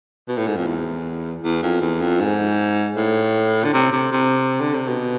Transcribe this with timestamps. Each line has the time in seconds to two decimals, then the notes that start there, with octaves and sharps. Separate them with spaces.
0.29 B2
0.38 A2
0.47 G#2
0.57 F2
0.67 E2
1.43 E2
1.63 F2
1.81 E2
2.02 F2
2.21 G#2
2.97 A2
3.65 D3
3.73 C3
3.92 C3
4.12 C3
4.61 D3
4.75 C3
4.88 B2